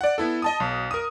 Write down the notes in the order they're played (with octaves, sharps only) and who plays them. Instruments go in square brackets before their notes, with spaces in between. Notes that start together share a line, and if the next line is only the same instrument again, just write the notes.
[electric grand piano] D5 F#5
B3 E4 A4
D#5 A5 D#6
B1
A#4 D#6